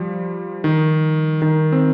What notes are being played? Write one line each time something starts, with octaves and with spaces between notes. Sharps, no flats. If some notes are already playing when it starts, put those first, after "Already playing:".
Already playing: F3 G3
D#3
D#3
C4